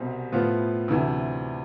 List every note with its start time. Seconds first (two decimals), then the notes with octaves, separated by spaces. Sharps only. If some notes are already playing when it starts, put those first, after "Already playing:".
Already playing: C2 B2 G3 C4
0.32 A2 F3 B3 F4
0.88 D2 C3 E3